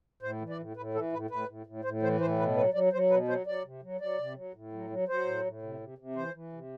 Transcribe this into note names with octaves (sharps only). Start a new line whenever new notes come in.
A2 C5
E3
D5
A2
A2 B4
E3 A4
A2 B4
A2 B4
A2
A2
A2 C5
E3 C5
A2 C5
B2 B4
F#3 B4
F#3 D5
F#3 C5
B2 B4
F#3 C5
F#3 D5
C3
F#3
F#3 D5
C3
F#3
A2
F#3
F#3
F#3 C5
A2
A2
C3
C3
C3
E3 C5
E3
C3